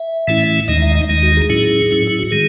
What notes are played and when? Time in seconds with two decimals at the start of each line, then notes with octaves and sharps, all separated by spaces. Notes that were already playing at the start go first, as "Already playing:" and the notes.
Already playing: E5
0.28 A2 E3 A3 C#4 E4
0.68 D#2 D#3 G#3 D#4 D#5
0.82 E5
0.95 D#5
1.09 D#2 D#3 G#3 D#4
1.23 F#4
1.37 G#4
1.49 A2 F#3 C#4 E4
1.91 A2 F#3 C#4 E4
2.07 E4
2.19 F#4
2.31 D#3 G#3 G#4